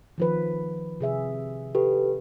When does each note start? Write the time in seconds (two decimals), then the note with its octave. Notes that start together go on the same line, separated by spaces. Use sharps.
0.18 D#3 F3 B4
1.01 C3 G#4 E5
1.75 G4 A4 B4